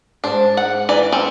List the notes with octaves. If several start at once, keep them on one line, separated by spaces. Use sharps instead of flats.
G#2 G#3 D4 C5
F#5
E3 D5
C4 C#4